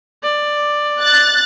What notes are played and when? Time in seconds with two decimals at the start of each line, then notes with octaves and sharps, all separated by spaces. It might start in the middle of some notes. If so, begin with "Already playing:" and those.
0.23 D5
1.01 F#6 A6